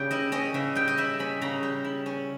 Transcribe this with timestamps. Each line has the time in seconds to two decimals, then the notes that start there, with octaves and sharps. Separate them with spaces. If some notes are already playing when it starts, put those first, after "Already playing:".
Already playing: C#3 G3 C#4 G5
0.11 E4 D#5
0.32 C#4 D#5
0.54 C#3 E5
0.75 G3 G5
0.88 D#5
0.97 E4 E5
1.19 C#4 B5
1.41 C#3 A#5
1.63 G3
1.84 E4
2.06 C#4